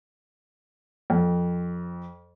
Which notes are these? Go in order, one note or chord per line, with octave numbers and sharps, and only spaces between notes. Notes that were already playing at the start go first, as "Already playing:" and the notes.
F2